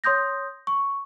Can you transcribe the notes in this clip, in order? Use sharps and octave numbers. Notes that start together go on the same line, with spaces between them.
C#5 C6 D#6 G6 A#6
C#6